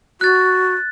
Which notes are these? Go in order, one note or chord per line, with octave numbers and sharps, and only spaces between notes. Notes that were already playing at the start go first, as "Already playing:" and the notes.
F#4 F#6 A6